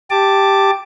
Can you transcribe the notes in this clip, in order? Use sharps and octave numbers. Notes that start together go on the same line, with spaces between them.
G4 A5 D6